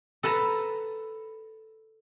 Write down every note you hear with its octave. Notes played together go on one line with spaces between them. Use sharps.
A4 B4 A5 A#5